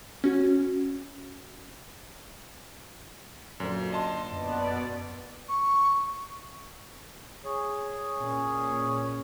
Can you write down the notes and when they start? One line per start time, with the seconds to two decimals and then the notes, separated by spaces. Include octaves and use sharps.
0.24 C#4 F#4
3.60 F#2 A#2 D3 C5
3.93 D#5 A5 C6
4.32 F#2 B2 B3 D5
5.49 C#6
7.45 G#4 C#5
8.16 A#2 C#4